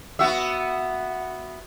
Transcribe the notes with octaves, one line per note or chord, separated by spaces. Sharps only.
B3 F#4 E5